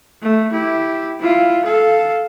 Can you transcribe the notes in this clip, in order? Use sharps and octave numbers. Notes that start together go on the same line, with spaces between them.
A3
E4 G4
E4 F4
A4 F5